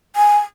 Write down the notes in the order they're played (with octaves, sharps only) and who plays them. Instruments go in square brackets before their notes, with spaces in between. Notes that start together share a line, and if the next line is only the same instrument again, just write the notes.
[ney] G#5